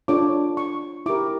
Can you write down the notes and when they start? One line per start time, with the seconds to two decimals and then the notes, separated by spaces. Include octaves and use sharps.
0.08 D4 F4 A4 C#5 D6
0.57 C#6
1.06 E4 G4 A#4 D6